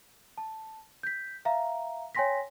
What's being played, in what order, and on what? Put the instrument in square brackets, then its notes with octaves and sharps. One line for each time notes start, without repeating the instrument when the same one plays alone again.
[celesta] A5
G6 B6
E5 F5 A#5
C#5 G5 G#5 C6 A#6 B6